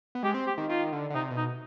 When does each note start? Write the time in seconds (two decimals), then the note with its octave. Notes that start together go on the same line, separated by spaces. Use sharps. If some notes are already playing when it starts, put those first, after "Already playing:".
0.15 B3
0.23 G#3 G4
0.34 C4
0.46 G4
0.58 D#3
0.69 D#3 F4
0.92 D3
1.10 D3
1.15 C3 D#4
1.30 B2
1.37 D#4